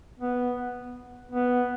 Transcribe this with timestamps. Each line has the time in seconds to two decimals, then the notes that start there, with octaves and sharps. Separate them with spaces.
0.20 B3
1.32 B3